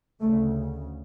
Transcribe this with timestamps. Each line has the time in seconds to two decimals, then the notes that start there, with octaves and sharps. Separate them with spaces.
0.22 D2 C#3 A3